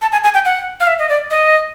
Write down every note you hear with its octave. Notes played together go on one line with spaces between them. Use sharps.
A5
G#5
G#5
G5
F#5
F5
E5
D#5
D5
D#5